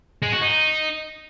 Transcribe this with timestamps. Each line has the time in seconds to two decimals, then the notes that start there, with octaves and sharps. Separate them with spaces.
0.22 G#3
0.32 F#4
0.42 D#4